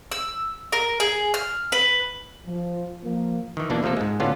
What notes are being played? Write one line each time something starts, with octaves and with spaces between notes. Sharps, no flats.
E6
A#4
G#4
F6
B4
F3
F3 A#3
D#3 E3
B2 E3 A#3 D4
C3 F3 A3 A#3 A4
G#2 G#3
A2 D3 B3 C#4 F4